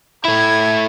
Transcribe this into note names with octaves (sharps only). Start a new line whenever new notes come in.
A3 E4 G#6